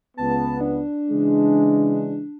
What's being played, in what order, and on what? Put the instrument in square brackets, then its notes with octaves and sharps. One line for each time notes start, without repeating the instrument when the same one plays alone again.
[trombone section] C#2 B3 [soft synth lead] A5
[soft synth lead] D4
[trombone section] C#3 E3 G#3